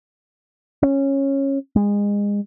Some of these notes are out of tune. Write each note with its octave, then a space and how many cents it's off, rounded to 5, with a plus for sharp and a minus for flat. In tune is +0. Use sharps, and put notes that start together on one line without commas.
C#4 -15
G#3 -25